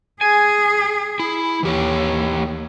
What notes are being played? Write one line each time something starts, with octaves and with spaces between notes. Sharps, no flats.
G#4 G#5
E4
D#2 E3 G4 C#5